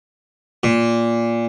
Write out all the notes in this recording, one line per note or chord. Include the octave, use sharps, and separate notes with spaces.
A#2